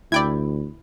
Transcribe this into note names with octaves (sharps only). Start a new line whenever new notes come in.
D2 E4 D5 G5 G#6